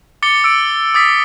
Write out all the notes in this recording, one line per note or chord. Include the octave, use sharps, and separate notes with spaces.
D6 A6 C#7 G7
E6 D7
D6 D#6 A6 B6